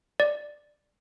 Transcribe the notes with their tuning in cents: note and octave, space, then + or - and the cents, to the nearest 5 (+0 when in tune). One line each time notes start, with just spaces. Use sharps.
D5 +10